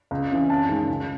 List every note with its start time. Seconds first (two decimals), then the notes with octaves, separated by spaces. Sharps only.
0.11 C#2
0.30 C#3 E3
0.50 F#2 A5
0.69 D#3 G#3
0.88 C#2